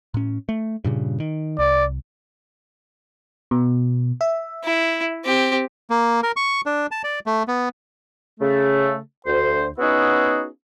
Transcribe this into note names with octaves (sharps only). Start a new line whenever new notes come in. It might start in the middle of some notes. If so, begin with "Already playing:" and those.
A2 C#4
A3
G2 A#2 C#3
D#3
C2 D5
B2
E5
E4
C4 G4
A#3
A#4
C#6
D4
A5
D5
A3
B3
C#3 A3
D2 C5
B3 C#4 D#4 E4 F#4 G#4